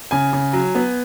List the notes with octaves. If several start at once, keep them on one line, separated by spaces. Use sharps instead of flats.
C#3 G#5
C#3
F#3
B3